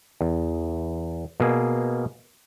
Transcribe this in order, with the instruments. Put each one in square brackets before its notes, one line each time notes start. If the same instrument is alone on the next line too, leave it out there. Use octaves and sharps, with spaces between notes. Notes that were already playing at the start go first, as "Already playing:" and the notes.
[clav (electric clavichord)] E2
B2 A#3 G#4